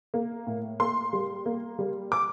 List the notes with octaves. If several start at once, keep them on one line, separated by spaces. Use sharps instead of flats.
A#3
A2
A#3 C6
G3
A#3
G3
D6